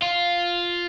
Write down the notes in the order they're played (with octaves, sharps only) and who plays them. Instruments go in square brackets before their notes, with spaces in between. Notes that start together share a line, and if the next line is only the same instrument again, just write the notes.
[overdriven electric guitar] F4